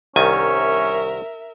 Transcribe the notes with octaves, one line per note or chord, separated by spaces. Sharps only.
C2 D#3 C#4 A#4 E5 G#5